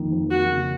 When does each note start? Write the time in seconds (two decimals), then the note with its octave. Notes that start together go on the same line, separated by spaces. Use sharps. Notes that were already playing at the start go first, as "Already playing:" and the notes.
Already playing: F2 D#3 A#3
0.12 F2
0.31 A#3 F#4
0.50 C#3